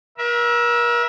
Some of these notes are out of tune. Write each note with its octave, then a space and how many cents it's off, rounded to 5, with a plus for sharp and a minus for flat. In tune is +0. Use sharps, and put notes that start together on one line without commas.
A#4 +40 E5 +0